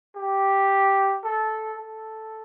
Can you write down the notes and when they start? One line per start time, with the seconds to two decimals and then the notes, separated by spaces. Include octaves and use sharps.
0.16 G4
1.24 A4
1.79 A4